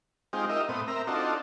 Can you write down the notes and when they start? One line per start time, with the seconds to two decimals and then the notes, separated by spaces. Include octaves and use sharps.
0.33 G#3 C4 D#4 F4 G4
0.49 D#4 F4 G4 A#4 D#5 E5
0.69 A2 B3 C4 D#6
0.88 C4 A#4 E5 A#5
1.07 C4 D4 D#4 F4 F#4 A4